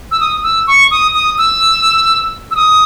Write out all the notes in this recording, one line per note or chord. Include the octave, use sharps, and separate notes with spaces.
E6
D#6
E6
C#6
D#6
D#6
E6
E6
D#6